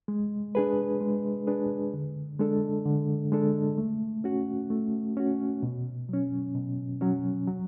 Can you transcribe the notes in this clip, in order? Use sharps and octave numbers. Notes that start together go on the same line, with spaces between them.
G#3
D4 G#4 B4
G#3
D4 G#4 B4
D3
G#3 D4 A4
D3
G#3 D4 A4
A3
C#4 F#4
A3
C#4 F#4
B2
F#3 C#4
B2
F#3 C#4
F#3